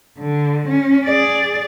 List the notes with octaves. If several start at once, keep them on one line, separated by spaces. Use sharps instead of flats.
D3
C#4
G#4 D5